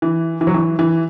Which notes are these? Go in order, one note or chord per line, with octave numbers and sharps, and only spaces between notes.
E3
E3
F#3
E3
E3